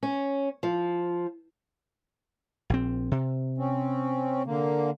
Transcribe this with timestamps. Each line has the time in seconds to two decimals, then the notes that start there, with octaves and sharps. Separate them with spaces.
0.03 C#4
0.63 F3
2.70 A#1 C4
3.12 C3
3.58 C4 C#4
4.46 D3 A#3